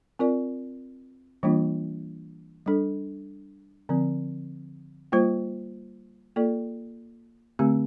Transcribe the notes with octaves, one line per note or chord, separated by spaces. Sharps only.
C4 F4 A#4 D5
E3 G3 A#3 D4 F4
G3 D4 A4
D3 F3 C4
G3 A#3 F4 C5
A#3 F4 A4 D5
D3 A3 C4 G4